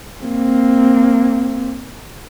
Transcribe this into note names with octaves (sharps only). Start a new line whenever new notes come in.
A#3 C4